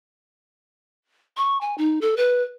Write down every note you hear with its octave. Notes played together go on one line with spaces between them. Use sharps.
C#6
G#5
D#4
A4
B4